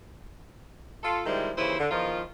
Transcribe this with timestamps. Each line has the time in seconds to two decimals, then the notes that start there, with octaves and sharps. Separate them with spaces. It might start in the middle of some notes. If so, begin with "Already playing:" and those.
1.03 F4 A4
1.26 D#3 F3 G3 G#3 E4
1.57 D#2 C#3 E3 E4 C5
1.79 D3
1.91 E2 D#3 F3 F4 A#4